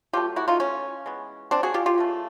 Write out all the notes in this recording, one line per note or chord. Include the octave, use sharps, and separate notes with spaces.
B2 F#3 A3 F4 G4
E4 F#4
D#4 F4
C#4
E3 G#3 B3
C4 D4
F#4 G#4
F4 G4
F4 G4
C#3 E3 A3